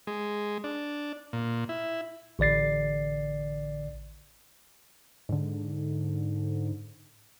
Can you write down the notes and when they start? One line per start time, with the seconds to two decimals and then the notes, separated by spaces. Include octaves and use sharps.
0.07 G#3
0.64 D4
1.33 A#2
1.69 E4
2.39 A1 D3 D5 A6 C7
5.29 G#2 D3